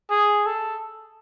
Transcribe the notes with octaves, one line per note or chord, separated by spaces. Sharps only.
G#4
A4